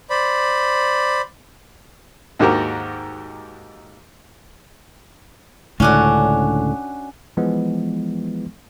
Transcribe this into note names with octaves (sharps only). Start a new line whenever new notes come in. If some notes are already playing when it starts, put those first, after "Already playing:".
C5 D5 B5
D#2 G#2 F#4 G4 A#4
C#2 A2 D3 C#4 D4 F#4
E3 F3 G#3 B3